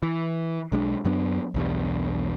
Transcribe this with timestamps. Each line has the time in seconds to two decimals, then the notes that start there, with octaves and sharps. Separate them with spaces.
0.03 E3
0.72 B1 G#3 C4 D4
1.05 F#2 F#3 B3 D4
1.54 B1 E2 G2